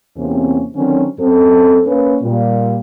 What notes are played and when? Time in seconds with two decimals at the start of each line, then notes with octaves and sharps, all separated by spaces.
0.16 E2 C3 A#3 C4 C#4
0.75 D3 D#3 F#3 C4 C#4
1.19 F#2 C4 A4
1.86 A#3 C#4 B4
2.22 A#2 G3